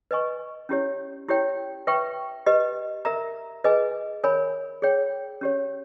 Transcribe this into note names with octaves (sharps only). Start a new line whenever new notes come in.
B4 D#5 G#5 C#6
C#4 E4 G4 C#5
E4 G4 C#5 G5
B4 E5 G5 C#6
G4 B4 D#5
A#4 E5 A#5
G#4 B4 D#5 G#5
A#4 C#5 G#5 B5
G#4 C#5 G5
C#4 G4 C#5